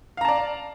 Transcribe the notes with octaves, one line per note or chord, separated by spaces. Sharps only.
D5 F5 A5 A#5